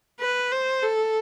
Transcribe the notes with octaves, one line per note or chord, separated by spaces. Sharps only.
B4
C5
A4